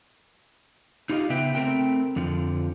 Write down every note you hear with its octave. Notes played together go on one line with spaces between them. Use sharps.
D#4 F4 G4 G#4 D#5 F5
C#3 B3 B4 E5 G5
A3 C4 A#4 E5 G5
F2 D3 F3